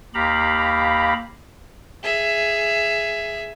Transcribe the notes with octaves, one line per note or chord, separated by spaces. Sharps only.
D#2 G4 F5 A#5 B5
G#4 E5